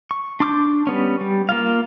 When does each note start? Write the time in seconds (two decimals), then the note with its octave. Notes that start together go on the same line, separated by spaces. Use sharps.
0.11 C#6
0.40 D4 C6 D6 E6 G6
0.87 G3 B3 C#4
1.21 G3
1.49 A#3 F4 F5